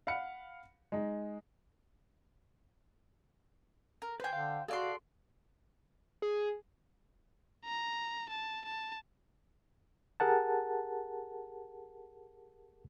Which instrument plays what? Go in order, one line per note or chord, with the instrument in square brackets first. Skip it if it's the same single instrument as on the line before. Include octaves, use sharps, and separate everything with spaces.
[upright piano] F5 F#5 B5 F6 C#7
G#3 D#4
[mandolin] A#4
[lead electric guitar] B4 G#5 [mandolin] C5 G5
[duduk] D3 [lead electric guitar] F5
[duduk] F#4 [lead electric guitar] G#4 F5 [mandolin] A4 D5 C6
[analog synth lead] G#4
[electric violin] A#5
A5
A5
[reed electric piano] G4 G#4 A#4 F#5 A5